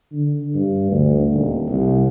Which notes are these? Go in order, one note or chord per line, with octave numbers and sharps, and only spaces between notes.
D3
G2
D2
D#1
C2